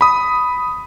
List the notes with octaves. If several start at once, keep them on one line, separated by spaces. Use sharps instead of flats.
B5 D#6